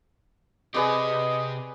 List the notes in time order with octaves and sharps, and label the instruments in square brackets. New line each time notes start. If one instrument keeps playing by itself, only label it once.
[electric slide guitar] C3 C4 G4 [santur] G#4 B4 D5 [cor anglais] D#5